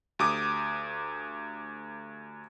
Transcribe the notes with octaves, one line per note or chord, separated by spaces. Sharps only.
D2 G4 D6 D#6